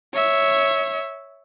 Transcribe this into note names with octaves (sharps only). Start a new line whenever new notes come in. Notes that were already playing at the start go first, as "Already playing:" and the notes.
C#5 E5